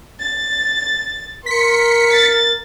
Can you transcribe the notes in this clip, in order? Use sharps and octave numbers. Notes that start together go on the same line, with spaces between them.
A6
A#4 C6 B6 C#7
A6